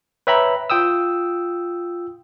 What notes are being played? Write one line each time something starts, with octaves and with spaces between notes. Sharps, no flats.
B4 C#5 E5 G5 A#5 B5
F4 G5 D#6 E6